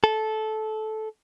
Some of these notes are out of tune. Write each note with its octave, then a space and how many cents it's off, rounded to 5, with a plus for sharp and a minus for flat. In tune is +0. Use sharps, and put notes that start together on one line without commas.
A4 -15